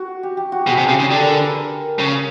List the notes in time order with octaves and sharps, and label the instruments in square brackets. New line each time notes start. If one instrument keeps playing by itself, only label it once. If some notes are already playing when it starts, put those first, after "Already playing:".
Already playing: [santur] F#4
G4
G4
F#4
[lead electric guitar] B2 [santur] G#4
[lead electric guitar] C3
[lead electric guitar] C#3 [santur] G4
[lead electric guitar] C#3
[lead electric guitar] D3 [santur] A4
[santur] A#4
B4
A#4
[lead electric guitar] C#3